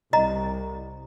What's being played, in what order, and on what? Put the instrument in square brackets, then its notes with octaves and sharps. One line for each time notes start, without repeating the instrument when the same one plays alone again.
[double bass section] C2 [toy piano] D#5 A#5